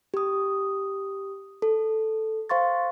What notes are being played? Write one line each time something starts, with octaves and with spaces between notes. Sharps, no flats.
G4 D#6
A4
C5 F5 C6 C#6 A6